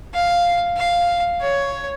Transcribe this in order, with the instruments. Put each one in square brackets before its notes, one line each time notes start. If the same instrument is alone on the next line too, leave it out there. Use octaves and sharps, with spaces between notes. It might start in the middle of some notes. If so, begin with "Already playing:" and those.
[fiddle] F5
F5
C#5